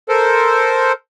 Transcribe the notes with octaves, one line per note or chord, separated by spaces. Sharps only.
A4 A#4 C5